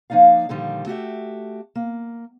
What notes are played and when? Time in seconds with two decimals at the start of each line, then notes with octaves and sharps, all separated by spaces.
0.10 F3 A#3 D#4 D5 F5
0.49 A#2 D3 D#3 F3 G3
0.86 A3 F#4 G4 E5
1.76 A#3